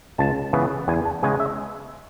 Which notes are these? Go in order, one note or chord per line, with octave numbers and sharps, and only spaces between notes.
C#2 A5
C#3 E3 B3
E2 G#5
A5
C#3 G#3 B3 G#5
E5